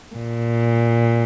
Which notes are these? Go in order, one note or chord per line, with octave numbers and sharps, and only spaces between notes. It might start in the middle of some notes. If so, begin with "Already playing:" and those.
A#2